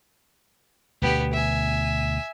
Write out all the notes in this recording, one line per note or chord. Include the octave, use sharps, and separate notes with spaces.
D2 B2 D3 B3 G4
E5 G#5